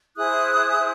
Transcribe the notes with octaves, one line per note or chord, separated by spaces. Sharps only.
E4 G#4 C5 D#6 F#6
E4 G#4 C5